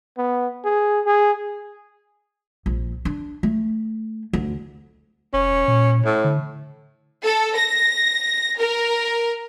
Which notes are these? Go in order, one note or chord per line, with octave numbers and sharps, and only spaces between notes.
B3
G#4
G#4
A#1
D4
A3
D2
F1 C#4
E1
A#2
A2
D3
A4
A#6
A#4